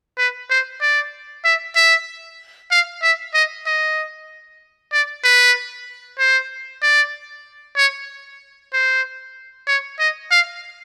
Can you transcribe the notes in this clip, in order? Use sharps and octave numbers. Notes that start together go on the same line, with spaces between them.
B4
C5
D5
E5
E5
F5
E5
D#5
D#5
D5
B4
C5
D5
C#5
C5
C#5
D#5
F5